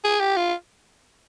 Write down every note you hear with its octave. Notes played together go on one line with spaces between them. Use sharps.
G#4
G4
F4